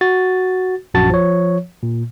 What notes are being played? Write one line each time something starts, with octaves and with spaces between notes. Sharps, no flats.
F#4 A6
A#1 F#2 F#4 A5 A6
F3 C#5
A#2